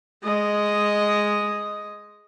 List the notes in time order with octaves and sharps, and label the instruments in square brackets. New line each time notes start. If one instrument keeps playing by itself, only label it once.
[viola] G#3 D#5